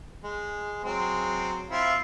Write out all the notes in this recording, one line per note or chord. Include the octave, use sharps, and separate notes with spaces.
G#3
F#3 G#3 C4
C4 E4 F4